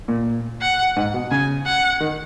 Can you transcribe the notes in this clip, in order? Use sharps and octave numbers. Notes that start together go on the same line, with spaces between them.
A#2
F#5
G#2
B2
C#3 G#5
F#5
D#3